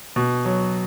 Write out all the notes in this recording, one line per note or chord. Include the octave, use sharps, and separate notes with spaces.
B2
F#3